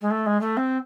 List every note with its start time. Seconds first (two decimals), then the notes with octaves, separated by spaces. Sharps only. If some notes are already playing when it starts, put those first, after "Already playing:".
0.01 G#3
0.10 A3
0.26 G#3
0.40 A3
0.56 C4